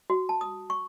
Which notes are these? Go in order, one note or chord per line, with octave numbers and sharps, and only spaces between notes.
F#4
A5
D#6
C#6